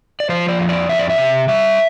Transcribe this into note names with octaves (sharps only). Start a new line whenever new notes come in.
D5
F3 C5
D5
F2
D5
F2 E5
D5
E5
C3
G3 E5